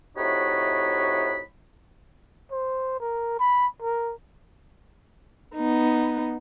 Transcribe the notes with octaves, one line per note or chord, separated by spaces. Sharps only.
A2 C3 D#4 F#4 C#5 B5
C5
A#4
B5
A#4
B3 D#4